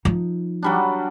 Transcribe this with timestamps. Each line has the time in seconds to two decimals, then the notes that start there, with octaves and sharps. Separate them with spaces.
0.05 F3 D#4
0.63 F#3 G3 D4